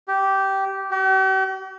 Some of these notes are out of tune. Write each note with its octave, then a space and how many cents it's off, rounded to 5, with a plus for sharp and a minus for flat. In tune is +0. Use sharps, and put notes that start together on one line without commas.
G4 -15
G4 -45